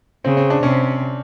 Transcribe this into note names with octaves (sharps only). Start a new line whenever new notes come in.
C#3 C4
C4
D4
C3 C#4